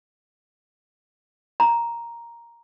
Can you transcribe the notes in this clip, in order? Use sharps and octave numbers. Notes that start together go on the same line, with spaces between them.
A#5